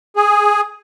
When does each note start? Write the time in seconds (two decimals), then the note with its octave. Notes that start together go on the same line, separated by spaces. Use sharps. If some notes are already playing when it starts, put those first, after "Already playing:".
0.16 G#4